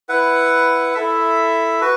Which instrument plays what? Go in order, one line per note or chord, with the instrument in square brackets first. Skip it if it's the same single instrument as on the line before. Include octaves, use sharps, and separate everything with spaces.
[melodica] E4 B4 F#5
E4 A4 E5
F#4 B4